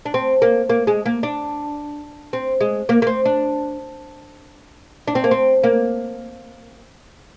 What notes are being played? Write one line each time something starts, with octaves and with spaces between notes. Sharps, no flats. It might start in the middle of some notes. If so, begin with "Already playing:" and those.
D4
C4
A#3
A#3
G#3
A#3
D4
C4
G#3
A#3
A#3
C4
D4
D4
C4
A#3
C4
A#3